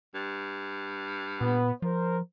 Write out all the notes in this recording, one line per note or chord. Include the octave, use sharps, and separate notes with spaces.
G2
A#2 B3
F3 A#4 C5